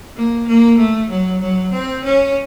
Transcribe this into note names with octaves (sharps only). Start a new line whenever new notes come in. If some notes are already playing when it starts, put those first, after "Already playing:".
A#3
A#3
A3
F#3
F#3
C4
C#4